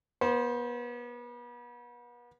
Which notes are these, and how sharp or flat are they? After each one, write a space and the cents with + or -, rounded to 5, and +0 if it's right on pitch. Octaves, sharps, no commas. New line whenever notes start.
B3 -35 C5 +0